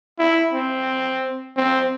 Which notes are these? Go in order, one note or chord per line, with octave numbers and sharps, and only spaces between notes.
E4
C4
C4